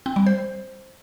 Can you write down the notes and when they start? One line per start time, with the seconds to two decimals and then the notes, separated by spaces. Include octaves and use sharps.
0.06 C4
0.16 G3
0.26 C5